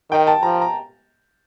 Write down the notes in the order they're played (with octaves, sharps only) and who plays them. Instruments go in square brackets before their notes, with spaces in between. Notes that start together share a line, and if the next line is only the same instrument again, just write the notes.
[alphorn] D#3 [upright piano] G5
[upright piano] A5
[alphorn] F3 [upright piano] A#5
[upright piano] A#5